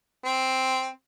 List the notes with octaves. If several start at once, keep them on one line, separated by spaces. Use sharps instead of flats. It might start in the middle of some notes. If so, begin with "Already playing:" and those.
C4